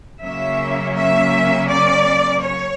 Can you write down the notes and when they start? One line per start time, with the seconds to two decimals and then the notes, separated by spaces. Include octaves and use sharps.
0.23 C#3 F#3 A#3 C#4 E5
0.96 E5
1.68 D5
2.42 C#5